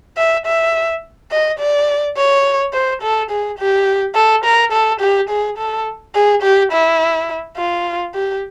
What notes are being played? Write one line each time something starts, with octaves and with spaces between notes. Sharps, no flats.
E5
E5
D#5
D5
C#5
C5
A4
G#4
G4
A4
A#4
A4
G4
G#4
A4
G#4
G4
E4
F4
G4